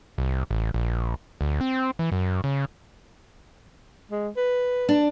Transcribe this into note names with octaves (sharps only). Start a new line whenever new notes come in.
C2
A1
A#1
D2
C4
E3
F#2
C#3
G#3
B4
D4